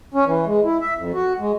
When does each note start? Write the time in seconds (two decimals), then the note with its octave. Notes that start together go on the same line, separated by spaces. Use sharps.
0.14 C#4
0.26 E3
0.46 G#3
0.64 E4
0.81 E5
0.98 F2
1.14 F#4
1.40 G#3